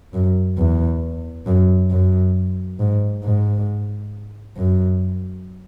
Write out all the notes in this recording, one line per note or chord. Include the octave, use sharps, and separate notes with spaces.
F#2
E2
F#2
F#2
G#2
G#2
F#2